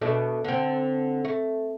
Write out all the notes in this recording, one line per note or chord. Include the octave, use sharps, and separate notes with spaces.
B2 A3 D4
D3 C4
A3